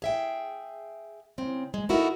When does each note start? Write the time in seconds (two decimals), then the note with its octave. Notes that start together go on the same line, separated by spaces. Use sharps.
0.02 G#4 E5 G5
1.38 C#3 C4
1.74 G#3
1.89 D#4 E4 F#4 A4 A#4